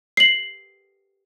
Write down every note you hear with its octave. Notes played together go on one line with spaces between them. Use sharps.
C7 F#7